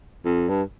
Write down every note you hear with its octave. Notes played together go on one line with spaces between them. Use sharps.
F2
G2